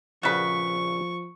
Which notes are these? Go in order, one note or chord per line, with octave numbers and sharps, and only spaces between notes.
A#1 C#3 F3 F#4 B4 A5 C#6